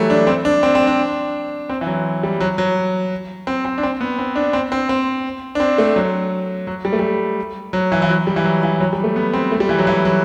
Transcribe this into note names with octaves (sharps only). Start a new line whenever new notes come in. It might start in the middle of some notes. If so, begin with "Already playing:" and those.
Already playing: E3 F#3 G3 A3
D4
C4
D4
C4
C4
D4
C4
E3
F#3
G3
F#3
F#3
C4
C4
D4
C4
B3
C4
D4
C4
C4
C4
D4
C4
A3
F#3
F#3
G3
A3
G3
F#3
E3
E3
F#3
G3
E3
F#3
E3
F#3
G3
A3
B3
C4
A3
G3
E3
F#3
E3
F#3